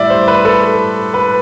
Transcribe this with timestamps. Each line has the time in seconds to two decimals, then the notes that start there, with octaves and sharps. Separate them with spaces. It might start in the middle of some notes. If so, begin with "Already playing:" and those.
Already playing: A2 G3 D5 E5
0.10 C5
0.28 B4
0.45 A4
1.14 B4